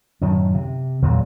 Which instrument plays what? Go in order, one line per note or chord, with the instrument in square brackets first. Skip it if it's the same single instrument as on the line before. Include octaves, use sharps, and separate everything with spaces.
[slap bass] F#2 A2 D#3
C3
E2 A#2 E3 F#3